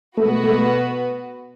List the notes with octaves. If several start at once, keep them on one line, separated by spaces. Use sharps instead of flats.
B2 A3 B3 F#4 B4
A3